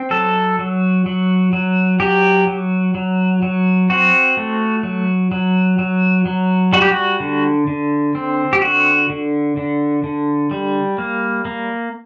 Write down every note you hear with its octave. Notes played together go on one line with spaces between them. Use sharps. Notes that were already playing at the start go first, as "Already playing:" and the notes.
Already playing: C4
F#3 A4
F#3
F#3
F#3
F#3 G4
F#3
F#3
F#3
C4 F#4
A3
F#3
F#3
F#3
F#3
G3 F#4
G4
F#4
D3
D3
C4
G4
D3 F#4
D3
D3
D3
G3
A#3
A#3